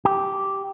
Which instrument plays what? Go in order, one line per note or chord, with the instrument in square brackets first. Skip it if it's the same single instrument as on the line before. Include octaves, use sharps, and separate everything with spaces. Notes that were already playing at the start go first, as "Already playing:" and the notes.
[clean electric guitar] G4